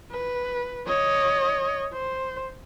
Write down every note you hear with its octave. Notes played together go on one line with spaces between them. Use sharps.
B4
C#5 D#5
C5